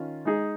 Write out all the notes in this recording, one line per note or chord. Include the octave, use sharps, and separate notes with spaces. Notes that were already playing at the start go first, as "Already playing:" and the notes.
Already playing: D#3 C#4 F4
G#3 D#4 G#4